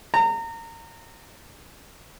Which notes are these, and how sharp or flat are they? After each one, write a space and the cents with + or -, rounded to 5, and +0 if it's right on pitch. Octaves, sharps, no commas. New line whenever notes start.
A#5 -30